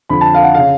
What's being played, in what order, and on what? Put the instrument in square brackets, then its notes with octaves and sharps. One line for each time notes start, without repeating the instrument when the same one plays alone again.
[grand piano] F2 D3 B5
A5
F5
F#5
C#3 F5